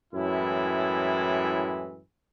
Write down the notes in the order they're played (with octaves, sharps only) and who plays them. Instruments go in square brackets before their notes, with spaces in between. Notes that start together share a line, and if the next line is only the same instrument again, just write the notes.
[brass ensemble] F#2 A2 E3 G#3 E4